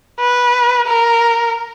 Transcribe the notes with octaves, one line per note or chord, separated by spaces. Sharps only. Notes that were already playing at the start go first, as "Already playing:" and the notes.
B4
A#4